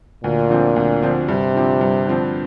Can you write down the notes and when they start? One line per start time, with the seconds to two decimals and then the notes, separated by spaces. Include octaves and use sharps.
0.24 D2 A#2
0.50 D3 F3 C4
0.76 D2
1.02 D3 F3 C4
1.28 G2 C3
1.55 D3 F3 C4
1.81 G2
2.07 D3 F3 C4